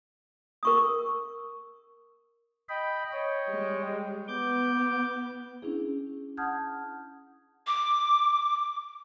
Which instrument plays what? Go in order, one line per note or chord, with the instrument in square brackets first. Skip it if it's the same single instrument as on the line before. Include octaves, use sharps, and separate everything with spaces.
[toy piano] A#4 C#6 D#6
[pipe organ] D#5 G5 B5
C#5 D#5 G5
[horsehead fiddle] G3 G#3
[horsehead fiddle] B3 [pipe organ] D6 G6
[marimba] C#4 D4 E4 G#4
F#5 A5 D#6 F6 G6 G#6
[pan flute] D6